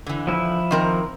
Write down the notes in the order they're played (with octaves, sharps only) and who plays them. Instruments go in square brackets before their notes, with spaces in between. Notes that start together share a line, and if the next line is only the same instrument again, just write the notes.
[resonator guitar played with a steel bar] D3 E3
[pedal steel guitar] F3 E4
[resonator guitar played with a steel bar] D#3 C4 A#4